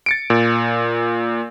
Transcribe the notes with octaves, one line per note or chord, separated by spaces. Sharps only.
A6 C#7 D7
A#2